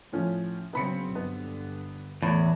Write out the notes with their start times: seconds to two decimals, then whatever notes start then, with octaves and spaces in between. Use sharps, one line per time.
0.12 A2 F3 C#4
0.73 C#3 F#3 B3 C4 B5 C#7
1.15 G2 D3 B3
2.22 E2 A2 E3 A3